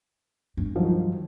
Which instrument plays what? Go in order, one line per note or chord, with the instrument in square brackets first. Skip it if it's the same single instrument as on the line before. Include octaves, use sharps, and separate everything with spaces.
[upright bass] G2
[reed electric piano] D#3 F3 F#3